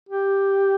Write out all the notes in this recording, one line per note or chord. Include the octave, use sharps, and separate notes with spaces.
G4